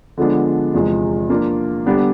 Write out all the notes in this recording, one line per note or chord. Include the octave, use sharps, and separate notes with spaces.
D3 F3 G#3 B3 D4
E2 C3 F3 G#3
F3 A#3 D4 F4
D3 G3 B3 D4 G4